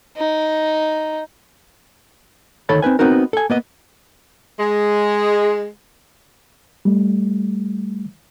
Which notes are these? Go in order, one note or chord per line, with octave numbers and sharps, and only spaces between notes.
D#4
D2 D#3 A4 C#5 A5 B5
C4 D#4 B4 G#5
B3 C4 D#4 F#4 A#4
A4 G#5
A#3 B3 D#5
G#3
G3 A3